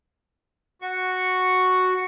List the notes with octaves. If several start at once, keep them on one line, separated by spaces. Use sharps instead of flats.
F#4 C#6